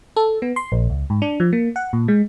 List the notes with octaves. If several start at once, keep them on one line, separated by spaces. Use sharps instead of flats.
A4
B3
C6
A#1
C#2
G#2
D4
F3
A#3
F#5
A#2
G#3